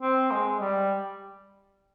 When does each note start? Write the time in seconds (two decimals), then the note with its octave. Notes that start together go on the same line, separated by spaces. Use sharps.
0.02 C4
0.31 G#3
0.60 G3